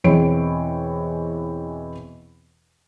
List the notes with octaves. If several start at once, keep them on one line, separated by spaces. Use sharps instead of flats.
E2 B2 E3 C4 C#5 D7